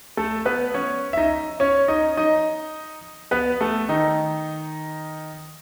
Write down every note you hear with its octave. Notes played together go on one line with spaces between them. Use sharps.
A3 A4
B3 B4
C#4 C#5
E5
D#4 D#5
C#4 C#5
D#4 D#5
D#4 D#5
B3 B4
A3 A4
D#3 D#4